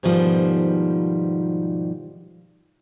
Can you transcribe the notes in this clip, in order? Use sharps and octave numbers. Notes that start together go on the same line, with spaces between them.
G#2 B2 D#3 F3 G3